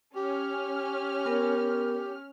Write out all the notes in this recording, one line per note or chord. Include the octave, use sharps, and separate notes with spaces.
C#4 G4 F6
B3 A#4